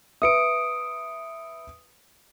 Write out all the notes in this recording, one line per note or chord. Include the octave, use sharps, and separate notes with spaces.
B4 E5 D#6 C#7 D7